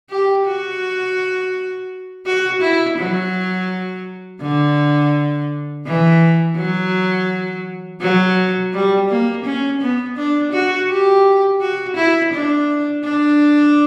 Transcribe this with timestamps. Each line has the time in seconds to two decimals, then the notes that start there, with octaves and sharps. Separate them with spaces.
0.10 G4
0.46 F#4
2.26 F#4
2.61 E4
2.98 F#3
4.41 D3
5.86 E3
6.57 F#3
8.01 F#3
8.73 G3
9.09 A#3
9.45 C#4
9.81 B3
10.16 D4
10.52 F#4
10.89 G4
11.61 F#4
11.96 E4
12.33 D4
13.04 D4